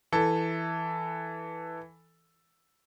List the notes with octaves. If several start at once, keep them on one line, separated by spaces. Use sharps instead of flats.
E3 A4